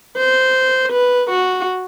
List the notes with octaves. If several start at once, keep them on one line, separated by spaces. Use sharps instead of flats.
C5
B4
F#4